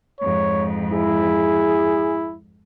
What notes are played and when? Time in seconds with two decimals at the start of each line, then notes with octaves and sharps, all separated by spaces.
0.21 F2 G#2 C#5
0.92 E4 G#4